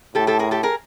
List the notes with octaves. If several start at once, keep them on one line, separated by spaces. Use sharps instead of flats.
A2 G4 A4
G4 A4
G#4 A#4
G4 A4
G#4 A#4